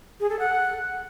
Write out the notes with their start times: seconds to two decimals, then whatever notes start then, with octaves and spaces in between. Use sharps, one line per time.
0.20 G#4
0.30 A4
0.39 F#5